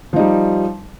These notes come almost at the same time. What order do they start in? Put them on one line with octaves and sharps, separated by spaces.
F3 D#4 G3